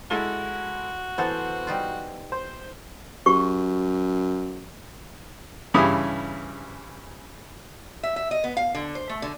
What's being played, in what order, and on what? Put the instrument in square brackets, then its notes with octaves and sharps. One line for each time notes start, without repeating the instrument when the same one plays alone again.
[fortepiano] G#3 E4 A4 [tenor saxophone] F#4 [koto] A5
[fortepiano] E3 C5 F#5 [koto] B3 A4
[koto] G3 D#4 F4
[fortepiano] C5 C6
[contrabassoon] F#2 [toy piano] F#4 G4 C#6
[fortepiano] G2 C#3 E3 E4 G4 D#6
[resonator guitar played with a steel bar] E5
E5
D#5
B3
F5
D3
C5
A3
D3